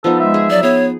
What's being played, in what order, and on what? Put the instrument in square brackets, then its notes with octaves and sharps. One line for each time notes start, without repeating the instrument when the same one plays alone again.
[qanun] F3 B3 D#4 [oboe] A4
[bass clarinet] G#3 [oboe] E5
[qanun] G#4
[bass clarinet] F#3 [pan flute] D5
[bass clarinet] B3 [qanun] G#4 [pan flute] C#5